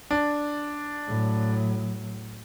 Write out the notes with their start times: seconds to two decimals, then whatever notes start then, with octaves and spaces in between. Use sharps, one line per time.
0.11 D4
1.07 A2 F#3